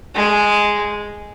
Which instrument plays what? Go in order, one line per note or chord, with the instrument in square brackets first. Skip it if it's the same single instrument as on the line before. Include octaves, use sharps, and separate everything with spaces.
[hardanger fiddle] G#3